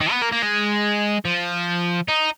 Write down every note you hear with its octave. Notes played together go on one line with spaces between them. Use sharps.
D#3
B3
A#3
A#3
G#3
F3
D#4